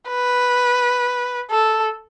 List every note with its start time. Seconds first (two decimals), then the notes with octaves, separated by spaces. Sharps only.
0.10 B4
1.51 A4